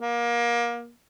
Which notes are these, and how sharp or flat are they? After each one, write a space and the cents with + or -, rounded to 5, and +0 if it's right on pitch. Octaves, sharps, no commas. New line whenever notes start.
A#3 +25